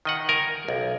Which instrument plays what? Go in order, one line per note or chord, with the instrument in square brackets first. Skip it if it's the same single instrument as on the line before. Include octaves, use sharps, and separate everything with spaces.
[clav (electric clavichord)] D#3 D#5 F#5
A#4 G#5
B1